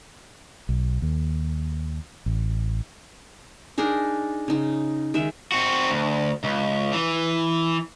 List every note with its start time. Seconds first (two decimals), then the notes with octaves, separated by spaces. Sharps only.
0.69 B1
1.02 D#2
2.26 A1
3.78 D4 D#4 G#4 A#4
4.48 C#3 D#4
5.14 D#3 G#3 E5
5.52 C4 F#4
5.90 D2
6.44 C#2
6.92 E3